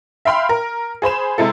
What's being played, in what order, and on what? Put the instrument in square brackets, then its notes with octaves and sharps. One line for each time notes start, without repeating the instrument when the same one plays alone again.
[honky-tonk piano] E5 F5 G5 B5 C6 F6
A#4
G#4 C5 B5 E7
C3 G#3 E4 A4